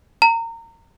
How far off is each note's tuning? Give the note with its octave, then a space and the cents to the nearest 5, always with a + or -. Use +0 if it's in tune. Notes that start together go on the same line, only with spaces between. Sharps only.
A#5 -25